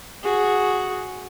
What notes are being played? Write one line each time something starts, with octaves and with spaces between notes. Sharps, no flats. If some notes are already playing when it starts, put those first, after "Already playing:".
F#4 G#4